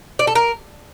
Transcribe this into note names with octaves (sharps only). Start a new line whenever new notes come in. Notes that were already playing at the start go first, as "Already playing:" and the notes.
D5
A4
A#4